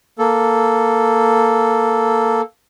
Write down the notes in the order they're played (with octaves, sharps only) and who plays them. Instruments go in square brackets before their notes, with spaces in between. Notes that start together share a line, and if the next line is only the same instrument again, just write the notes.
[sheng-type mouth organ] A#3 A4